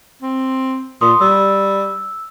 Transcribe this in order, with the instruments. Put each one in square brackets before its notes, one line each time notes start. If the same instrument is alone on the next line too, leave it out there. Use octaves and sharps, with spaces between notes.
[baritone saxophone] C4
[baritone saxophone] A#2 [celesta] C6 D#6
[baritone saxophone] G3 [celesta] E6